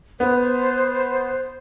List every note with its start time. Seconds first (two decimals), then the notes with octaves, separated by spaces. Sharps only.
0.20 B3 C5